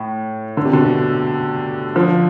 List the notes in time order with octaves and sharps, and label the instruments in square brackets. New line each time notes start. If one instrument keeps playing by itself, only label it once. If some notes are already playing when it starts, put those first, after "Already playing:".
Already playing: [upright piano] A2
D3
C3
B2 D3
D3 F3